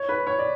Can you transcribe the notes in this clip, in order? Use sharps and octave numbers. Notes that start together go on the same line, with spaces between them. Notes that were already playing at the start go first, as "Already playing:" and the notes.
Already playing: C#5
B4
C#5
D5